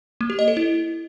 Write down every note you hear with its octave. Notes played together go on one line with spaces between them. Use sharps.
A#3
G4
D#5
A4
E4